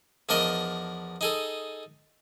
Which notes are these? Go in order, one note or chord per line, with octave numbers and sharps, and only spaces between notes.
E2 F3 D4 A#4 D#5
D#4 G#4 A4